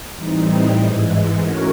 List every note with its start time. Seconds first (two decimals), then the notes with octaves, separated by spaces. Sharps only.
0.16 A2 E3 G3 C4 D#4
0.78 G#2 E3 G#3
1.40 A3 C#4 F#4 A#4 C#5